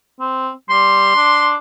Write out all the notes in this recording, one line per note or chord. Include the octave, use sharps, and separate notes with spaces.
C4
G3 C6
D4